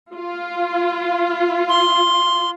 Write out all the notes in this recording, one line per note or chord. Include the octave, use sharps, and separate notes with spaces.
F4
C6